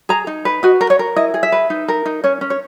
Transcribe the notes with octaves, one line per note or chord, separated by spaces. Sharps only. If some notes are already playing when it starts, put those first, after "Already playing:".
G#4 A#5
D#4
B4
F#4 D#5
A#4
C#5
A#4
E4 D#5
G#4
E5
B4
D#4
A#4
D#4
C#4 C#5
C#4
C#5